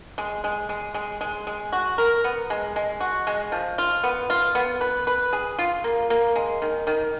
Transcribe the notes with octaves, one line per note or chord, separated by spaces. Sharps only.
G#3
G#3
G#3
G#3
G#3
G#3
F#4
A#4
B3
G#3
G#3
F#4
G#3
F3
F4
B3
F4
B3
B4
B4
G#4
F4
A#3
A#3
G#3
D#3
D#3